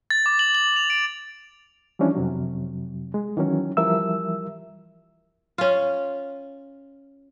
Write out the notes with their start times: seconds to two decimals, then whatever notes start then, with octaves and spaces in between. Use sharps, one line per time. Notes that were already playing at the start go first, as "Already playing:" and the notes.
0.10 A6
0.26 D6
0.39 F#7
0.55 F#7
0.76 F7
0.90 D7
1.99 E3 F3 G3 C#4 D4 E4
2.15 F2 C3 F#3
3.14 G#3
3.37 D#3 E3 F#3 C#4
3.77 E3 F3 G3 A#4 E5 E6
5.58 C#4 F4